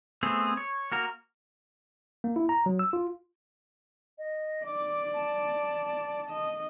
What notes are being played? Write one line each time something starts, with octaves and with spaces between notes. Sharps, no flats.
A3 B3 C4 G#4
C#5
A#3 F#4 A#4
A#3
E4
A#5
F#3
E6
F4
D#5
D5 D6
A5
D#5